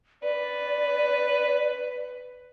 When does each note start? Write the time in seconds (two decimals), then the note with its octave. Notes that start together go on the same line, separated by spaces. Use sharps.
0.23 B4 D5